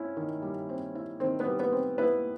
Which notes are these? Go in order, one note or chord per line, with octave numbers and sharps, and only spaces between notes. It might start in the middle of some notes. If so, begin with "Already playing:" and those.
Already playing: C4 C#4 E4
D#3
G3
C4
E4
D#3 C4 C5
B3 B4
G3
B3 B4
C4
B3 E4 B4